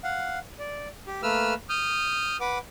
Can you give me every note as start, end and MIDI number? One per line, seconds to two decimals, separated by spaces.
0.04 0.39 77
0.04 0.39 78
0.59 0.88 74
1.07 1.21 67
1.23 1.54 57
1.23 1.54 58
1.23 1.54 71
1.23 1.54 88
1.23 1.54 89
1.69 2.37 87
1.69 2.37 89
1.69 2.37 91
2.41 2.58 71
2.41 2.58 78
2.41 2.58 86